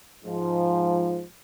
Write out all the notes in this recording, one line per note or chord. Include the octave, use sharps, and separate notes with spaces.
G#2 F3